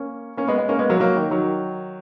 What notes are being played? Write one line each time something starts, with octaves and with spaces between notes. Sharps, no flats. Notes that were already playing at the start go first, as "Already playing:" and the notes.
Already playing: A#3 C#4
A#3 C#4
G#3 B3
G#3 B3
A#3 C#4
G#3 B3
F#3 A#3
F#3 A#3
D#3
D#3 F#3